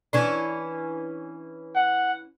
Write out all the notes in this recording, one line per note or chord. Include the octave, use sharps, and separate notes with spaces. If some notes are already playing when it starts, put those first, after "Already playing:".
E3 C#4 D4
F#5